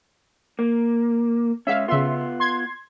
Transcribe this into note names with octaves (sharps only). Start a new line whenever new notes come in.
A#3
G#3 C#4 E5 F5
C#3 B3 F4 E5 C6
C6 G#6